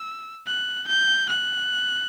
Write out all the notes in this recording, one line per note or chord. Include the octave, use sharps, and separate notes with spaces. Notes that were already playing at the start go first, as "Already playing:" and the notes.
Already playing: E6
F#6
G6
F#6